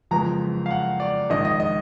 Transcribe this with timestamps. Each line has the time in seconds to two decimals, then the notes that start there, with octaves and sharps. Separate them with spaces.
0.11 F#1 F2 F3 G#3 B3 A#5
0.66 F5
0.71 F#5
1.00 D5
1.30 A#1 G#2 D#3 D#5
1.45 D#5
1.60 D#5